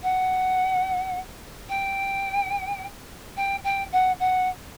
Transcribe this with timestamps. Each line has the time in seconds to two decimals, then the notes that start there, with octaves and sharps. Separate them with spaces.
0.03 F#5
1.69 G5
3.37 G5
3.64 G5
3.92 F#5
4.20 F#5